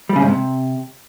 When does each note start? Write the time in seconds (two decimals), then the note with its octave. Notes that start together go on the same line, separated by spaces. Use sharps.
0.09 G3
0.16 C#3
0.22 G#2
0.29 C3